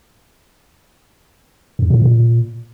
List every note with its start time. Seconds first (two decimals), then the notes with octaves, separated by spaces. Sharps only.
1.79 F2
1.90 A2
2.02 A#2